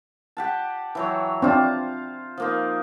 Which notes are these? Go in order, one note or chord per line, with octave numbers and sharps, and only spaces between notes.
G4 F#5 A5
E3 F#3 C#5
C4 D4 F4 C5
F3 A#3 D#4